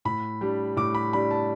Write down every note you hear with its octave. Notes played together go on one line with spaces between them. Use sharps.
A2 B5
G3 D4
A2 D6
B5
G3 D4 B5
A5